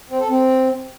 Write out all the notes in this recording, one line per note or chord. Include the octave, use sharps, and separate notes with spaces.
C4
A4
C4